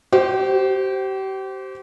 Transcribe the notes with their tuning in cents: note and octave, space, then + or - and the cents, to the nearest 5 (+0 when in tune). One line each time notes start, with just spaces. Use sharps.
G4 -35 C5 +0